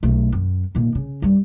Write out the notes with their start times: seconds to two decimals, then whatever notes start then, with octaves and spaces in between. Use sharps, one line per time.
0.03 B1 A3
0.32 F#2
0.75 A#2 D#3
0.95 C#3
1.22 G2 G3